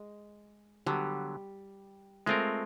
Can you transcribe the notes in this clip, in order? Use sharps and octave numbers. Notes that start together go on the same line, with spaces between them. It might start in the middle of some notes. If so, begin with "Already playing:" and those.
Already playing: G#3
D3 F#3 G3 B3
G#3 A3 C4 F4 A#4